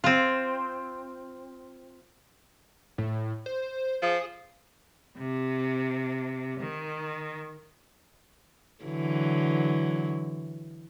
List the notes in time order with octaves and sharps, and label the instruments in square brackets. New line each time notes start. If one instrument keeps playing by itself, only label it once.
[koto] C4 F4
[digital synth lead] A2
C5
[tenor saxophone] F3 [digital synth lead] G#4
[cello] C3
D#3
[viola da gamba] D3 E3 F#3